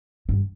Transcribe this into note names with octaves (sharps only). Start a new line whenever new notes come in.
G2